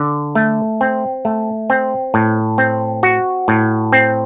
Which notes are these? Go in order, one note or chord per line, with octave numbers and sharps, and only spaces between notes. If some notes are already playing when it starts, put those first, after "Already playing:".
Already playing: D3
A3
C4
A3
C4
A2
C4
F#4
A2
C4